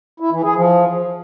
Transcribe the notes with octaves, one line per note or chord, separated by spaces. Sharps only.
E4
E3
G#4
F3